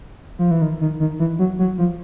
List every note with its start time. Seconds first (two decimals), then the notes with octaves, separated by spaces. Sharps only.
0.39 F3
0.51 E3
0.62 D#3
0.81 D#3
1.00 D#3
1.19 E3
1.39 F#3
1.59 F#3
1.78 F3